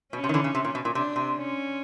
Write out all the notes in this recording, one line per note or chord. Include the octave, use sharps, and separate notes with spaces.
B2 C#4
C3
D#3
D3 E3
C#3
C3
A#2
B2
A#2
C3 D4
C3
C#4